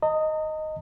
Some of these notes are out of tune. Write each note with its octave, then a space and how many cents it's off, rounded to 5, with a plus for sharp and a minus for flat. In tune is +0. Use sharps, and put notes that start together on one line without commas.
D#5 +0 A#5 -40